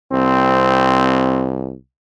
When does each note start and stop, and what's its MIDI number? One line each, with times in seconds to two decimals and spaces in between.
0.12 1.74 36
0.12 1.48 60